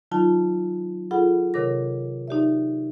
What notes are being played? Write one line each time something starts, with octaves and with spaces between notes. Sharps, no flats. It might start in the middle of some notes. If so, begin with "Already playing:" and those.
D#3 F#3 D#4 F4 A5
F4 G#4 A4 F#5 B5
C3 D#3 A#4 C#5 D6 A#6
D#4 G4 D5 E5